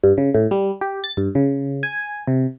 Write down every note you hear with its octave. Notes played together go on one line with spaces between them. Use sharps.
G2
C#3
A2
G3
G4
A6
G2
C#3
G#5
C3